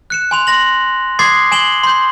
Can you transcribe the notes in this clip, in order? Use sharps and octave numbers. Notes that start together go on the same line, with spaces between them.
F#6 C#7 E7
G#5 C6 F7
C6 A#6 F#7
C6 D6 D#6 G#6 A6 C7
G#5 E7 F#7 G7
C6 G6